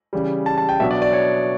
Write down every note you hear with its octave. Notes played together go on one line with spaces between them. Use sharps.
C#3 E3 G3
A5
A5
G5
B2 F#3 B3 D4 E5
D5
D5
C#5